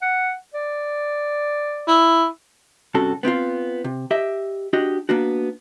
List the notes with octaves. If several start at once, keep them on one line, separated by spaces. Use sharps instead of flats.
F#5
D5
E4
G2 C3 C#4 F#4 A4
B3 C4 D#4 F4
C3
G4 D#5 E5
D4 F#4 G4 D#5
A#3 B3 D4 F#4